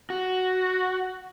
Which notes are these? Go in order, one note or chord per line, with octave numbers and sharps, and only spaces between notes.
F#4